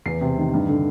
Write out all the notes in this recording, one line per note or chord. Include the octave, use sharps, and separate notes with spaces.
E2 C7
C3
D#3
G2
D3